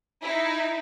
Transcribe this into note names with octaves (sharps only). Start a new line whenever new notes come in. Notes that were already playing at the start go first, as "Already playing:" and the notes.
D#4 E4